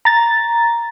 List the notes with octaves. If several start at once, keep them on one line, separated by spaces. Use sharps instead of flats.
A#5 A6